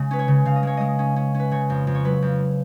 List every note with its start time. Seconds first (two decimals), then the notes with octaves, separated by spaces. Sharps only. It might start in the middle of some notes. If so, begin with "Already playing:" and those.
Already playing: C#3 G#3 D#5
0.11 C#4 B4
0.19 C#5
0.28 C#3
0.45 C#3 F5
0.56 D#5
0.63 G#3 C#5
0.77 G#3 D#5
0.99 C#4
1.16 C#4
1.35 C#4
1.40 B4
1.51 C#3 C#5
1.70 F2
1.87 F2
1.94 C#5
2.05 F#3 B4
2.22 F2